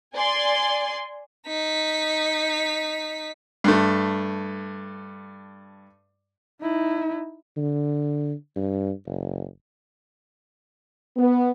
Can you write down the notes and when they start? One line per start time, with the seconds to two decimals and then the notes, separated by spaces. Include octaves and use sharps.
0.14 D5 G#5 C6
1.46 D#4 B6
3.64 G2 A3
6.61 D#4 E4
7.57 D3
8.56 G2
9.06 F#1
11.16 B3